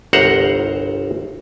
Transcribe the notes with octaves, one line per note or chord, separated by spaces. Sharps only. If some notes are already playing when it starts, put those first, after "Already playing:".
G1 C2 C5 F#5 A#5